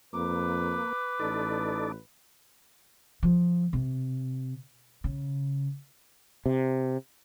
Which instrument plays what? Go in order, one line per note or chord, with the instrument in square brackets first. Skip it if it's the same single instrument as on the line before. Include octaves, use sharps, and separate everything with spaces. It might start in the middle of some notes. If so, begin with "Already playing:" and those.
[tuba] F2 [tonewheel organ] A#3 [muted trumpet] B4 [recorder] D6
[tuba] A1 [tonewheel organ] D#4 A4 D5
[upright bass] F3
C3
C#3
[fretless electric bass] C3